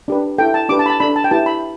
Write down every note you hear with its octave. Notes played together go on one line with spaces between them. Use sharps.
D4 G4 B4
E4 A4 G5
A5
D4 G4 B4 D6
A5
B5
A5
D4 A4 B5
A5
G5
E4 G4 B4 A5
B5